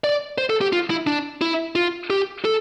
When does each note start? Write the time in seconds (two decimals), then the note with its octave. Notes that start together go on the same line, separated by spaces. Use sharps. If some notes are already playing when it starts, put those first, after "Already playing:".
0.04 D5
0.38 C5
0.50 A4
0.61 G4
0.73 F4
0.90 E4
1.07 D4
1.41 E4
1.75 F4
2.10 G4
2.45 A4